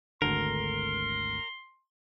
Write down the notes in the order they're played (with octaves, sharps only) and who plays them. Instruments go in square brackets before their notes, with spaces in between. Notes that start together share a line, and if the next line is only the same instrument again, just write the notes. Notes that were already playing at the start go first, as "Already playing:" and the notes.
[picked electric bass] G#1 D2 D3 [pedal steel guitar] A#4 [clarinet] C6